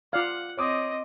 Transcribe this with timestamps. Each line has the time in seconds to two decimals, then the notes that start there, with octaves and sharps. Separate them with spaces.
0.13 F4 D5 F5 F#5
0.57 C4 C#5 D#5 D6 D#6